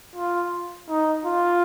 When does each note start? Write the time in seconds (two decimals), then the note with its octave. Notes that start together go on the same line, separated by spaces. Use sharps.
0.15 F4
0.89 D#4
1.25 F4